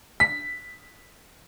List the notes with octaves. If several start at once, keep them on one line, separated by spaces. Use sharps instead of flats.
B6